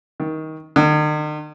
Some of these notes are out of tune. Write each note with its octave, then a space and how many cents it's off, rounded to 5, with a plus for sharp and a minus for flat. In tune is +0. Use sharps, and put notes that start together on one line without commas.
D#3 +20
D#3 -45